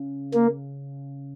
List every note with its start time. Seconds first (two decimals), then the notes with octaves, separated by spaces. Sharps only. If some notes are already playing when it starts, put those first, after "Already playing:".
Already playing: C#3
0.34 A#3